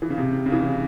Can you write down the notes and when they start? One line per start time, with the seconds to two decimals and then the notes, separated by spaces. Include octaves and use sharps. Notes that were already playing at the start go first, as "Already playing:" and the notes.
0.02 E3
0.10 C#3
0.18 C3
0.46 C#3
0.52 E3
0.59 C#3